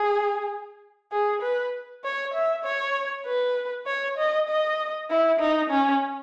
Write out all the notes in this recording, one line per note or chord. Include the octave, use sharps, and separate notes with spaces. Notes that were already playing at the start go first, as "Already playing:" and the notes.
Already playing: G#4
G#4
B4
C#5
E5
C#5
B4
C#5
D#5
D#5
E4
D#4
C#4